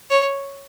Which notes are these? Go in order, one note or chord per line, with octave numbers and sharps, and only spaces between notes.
C#5